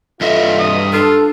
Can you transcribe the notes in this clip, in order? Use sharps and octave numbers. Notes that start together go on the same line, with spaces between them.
G2 F4 A4 D#5 E5
B2 D#6
D4 F4 A4